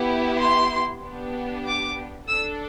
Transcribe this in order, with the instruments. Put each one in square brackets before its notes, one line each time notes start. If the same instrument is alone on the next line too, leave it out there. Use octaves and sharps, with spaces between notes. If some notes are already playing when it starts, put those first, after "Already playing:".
Already playing: [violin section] B3 E4 G4
C6
B3 D4 G4
D6
D4 A4 E6